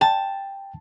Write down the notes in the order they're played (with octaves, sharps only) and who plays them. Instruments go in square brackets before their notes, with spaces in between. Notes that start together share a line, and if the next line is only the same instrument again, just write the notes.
[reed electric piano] G5 [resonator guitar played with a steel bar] A5